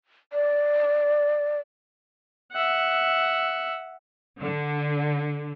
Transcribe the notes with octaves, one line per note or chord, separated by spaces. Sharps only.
D5
E5 F#5
D3